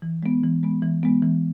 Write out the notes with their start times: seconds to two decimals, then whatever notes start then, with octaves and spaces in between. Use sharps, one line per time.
0.02 E3
0.23 G#3 B3
0.43 E3
0.63 G#3 B3
0.82 E3
1.03 G#3 B3
1.22 E3